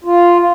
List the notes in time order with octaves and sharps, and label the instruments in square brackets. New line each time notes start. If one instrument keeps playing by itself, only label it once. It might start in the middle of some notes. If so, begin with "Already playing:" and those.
[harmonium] F4